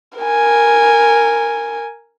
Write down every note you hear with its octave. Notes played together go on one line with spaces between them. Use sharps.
A#4 G#5